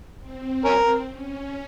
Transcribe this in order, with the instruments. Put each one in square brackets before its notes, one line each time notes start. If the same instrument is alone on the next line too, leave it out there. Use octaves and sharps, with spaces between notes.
[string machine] C4
[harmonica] C#4 A#4
[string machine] C#4